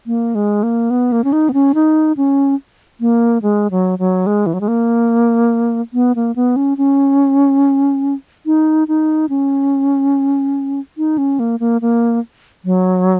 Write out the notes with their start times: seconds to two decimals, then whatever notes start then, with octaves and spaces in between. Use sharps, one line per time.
0.06 A#3
0.35 G#3
0.63 A#3
0.90 B3
1.12 A#3
1.24 C#4
1.33 D#4
1.49 B3
1.53 C#4
1.75 D#4
2.17 C#4
3.00 A#3
3.42 G#3
3.71 F#3
3.99 F#3
4.27 G#3
4.46 E3
4.54 F#3
4.61 G#3
4.68 A#3
5.93 B3
6.16 A#3
6.36 B3
6.56 C#4
6.78 C#4
8.46 D#4
8.88 D#4
9.29 C#4
10.98 D#4
11.18 C#4
11.39 A#3
11.60 A#3
11.81 A#3
12.65 F#3